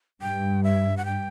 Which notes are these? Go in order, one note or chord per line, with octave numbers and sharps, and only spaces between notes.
G2 G5
E5
F#5
G5